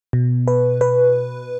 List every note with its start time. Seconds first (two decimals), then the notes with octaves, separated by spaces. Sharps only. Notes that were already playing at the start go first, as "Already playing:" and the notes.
0.13 B2
0.48 B4
0.81 B4